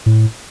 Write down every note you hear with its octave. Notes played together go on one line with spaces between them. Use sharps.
A2